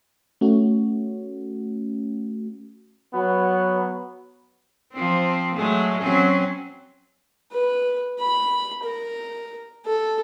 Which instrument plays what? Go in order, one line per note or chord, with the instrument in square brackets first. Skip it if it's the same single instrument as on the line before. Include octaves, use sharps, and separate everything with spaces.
[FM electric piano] A3 C#4 F#4
[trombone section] F#3 B3
[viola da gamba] F3 C4
F#3 G#3 A3
F#3 C4 C#4
[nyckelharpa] B4
B5
A#4
A4